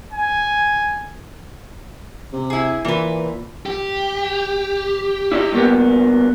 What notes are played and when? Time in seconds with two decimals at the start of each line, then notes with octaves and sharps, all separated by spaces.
0.12 G#5
2.33 C3
2.50 E4 G#4
2.85 A#2 E3 B4
3.66 G4
5.32 E4 D5 D#5
5.52 G2 A#3 B3